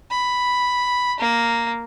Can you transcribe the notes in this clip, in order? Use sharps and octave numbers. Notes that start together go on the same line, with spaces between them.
B5
A#3